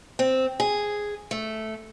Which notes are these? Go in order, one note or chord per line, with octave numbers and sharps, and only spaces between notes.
C4
G#4
A3